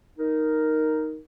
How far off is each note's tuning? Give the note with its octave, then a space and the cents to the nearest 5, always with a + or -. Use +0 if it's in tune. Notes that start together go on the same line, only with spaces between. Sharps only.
D#4 +0 A#4 +0